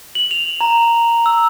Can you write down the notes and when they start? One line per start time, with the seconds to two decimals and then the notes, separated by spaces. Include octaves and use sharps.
0.15 F#7
0.31 F7
0.61 A#5
1.26 E6